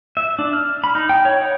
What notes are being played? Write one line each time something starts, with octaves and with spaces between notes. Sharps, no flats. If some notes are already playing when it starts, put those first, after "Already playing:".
E5
D4
F6
B5
D#4
G5
C#5
F#5